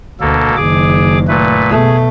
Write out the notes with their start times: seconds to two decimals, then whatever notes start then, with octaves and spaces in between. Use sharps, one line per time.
0.20 D2 B2 A#3 A4
0.57 F#1 D#3 G#4 D6
1.28 A#2 A3 B4
1.70 B2 A3 G#4